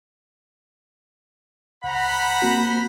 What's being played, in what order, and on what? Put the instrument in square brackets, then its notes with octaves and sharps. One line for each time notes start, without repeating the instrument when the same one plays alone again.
[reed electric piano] C#2 [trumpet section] C5 A#5 B5 [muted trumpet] F#5
[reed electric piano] A#3 C4 F#4